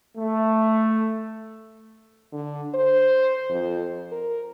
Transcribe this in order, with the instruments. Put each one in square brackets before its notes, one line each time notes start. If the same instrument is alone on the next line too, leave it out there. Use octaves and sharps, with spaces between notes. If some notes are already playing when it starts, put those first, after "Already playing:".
[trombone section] A3
[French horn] D3
C5
F2
A#4